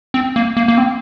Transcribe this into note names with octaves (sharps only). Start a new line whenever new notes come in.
C4
A#3
A#3
A#3
C4